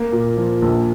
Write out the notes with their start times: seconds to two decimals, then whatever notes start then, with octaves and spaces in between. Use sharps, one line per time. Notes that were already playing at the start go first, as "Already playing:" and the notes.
Already playing: A#3
0.12 A#2
0.37 F3
0.62 A#1